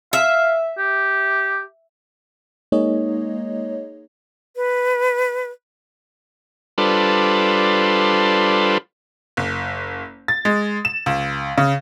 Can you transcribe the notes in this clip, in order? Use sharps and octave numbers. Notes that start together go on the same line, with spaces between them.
E5 F5
G4
G#3 A#3 D#4 G#4 C#5 D#5
B4
G3 D4 F4 A4 B4 C5
F#1
A6
G#3
E7
C#2
C#3